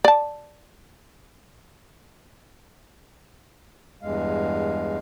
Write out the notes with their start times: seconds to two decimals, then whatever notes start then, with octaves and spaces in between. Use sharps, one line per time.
0.05 D5 A5
4.02 E2 G2 G#3 F5